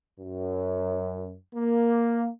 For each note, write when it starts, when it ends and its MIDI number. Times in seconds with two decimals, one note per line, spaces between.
0.20 1.37 42
1.56 2.29 58